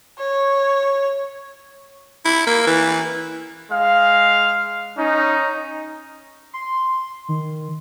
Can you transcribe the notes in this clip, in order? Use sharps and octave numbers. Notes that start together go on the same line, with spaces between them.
C#5
E4
A#3
E3
G#3 F5
C#4 D#4
C6
D#3